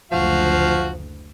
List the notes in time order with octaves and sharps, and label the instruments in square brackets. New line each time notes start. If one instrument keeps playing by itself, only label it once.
[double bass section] F#1 D2 [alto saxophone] F3 [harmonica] F#4 F5